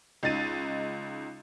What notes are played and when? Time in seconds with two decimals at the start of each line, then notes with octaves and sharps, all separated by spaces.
0.23 C#2 D#4 A6 D#7